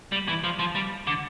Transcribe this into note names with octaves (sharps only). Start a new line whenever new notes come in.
G3
E3
F3
F3
G3
D3